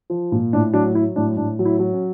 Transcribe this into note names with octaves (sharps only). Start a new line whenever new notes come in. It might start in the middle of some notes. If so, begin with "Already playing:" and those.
F3
A#2
A2 D4
F#3 D4
F#3 E4
A2 D4
A2 D4
F#3
E4
F#3
C#4